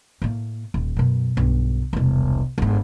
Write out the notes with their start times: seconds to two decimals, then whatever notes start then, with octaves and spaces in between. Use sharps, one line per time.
0.22 A2 A#3
0.74 D#1
0.96 F#2 B2
1.37 B1 G2
1.93 E1 C2
2.58 G1 G#2